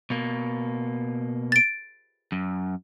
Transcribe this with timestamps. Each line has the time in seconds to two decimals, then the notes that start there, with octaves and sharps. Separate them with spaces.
0.10 B2 A#3
1.52 A6 D7
2.32 F#2